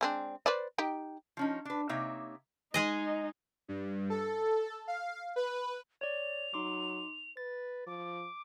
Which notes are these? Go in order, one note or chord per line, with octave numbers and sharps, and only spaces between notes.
G#3 C4 D4
B4 C5 D5
D#4 G4 G5
F3 C#4 D#4
D4 B4
C3 A#3 D#4 C#5 E5
G#3 D#4 G#4 D#5
G2
A4
F5
B4
C#5 D5 F7
F#3 D#4 C6 D6
B4 A6
F3 D6